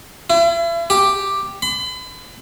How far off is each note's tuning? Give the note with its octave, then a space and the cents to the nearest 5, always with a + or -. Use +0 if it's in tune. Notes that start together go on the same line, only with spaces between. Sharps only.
E4 +40
G4 +5
B5 +40